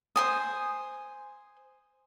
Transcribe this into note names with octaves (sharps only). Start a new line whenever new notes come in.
C5 G#5 D#6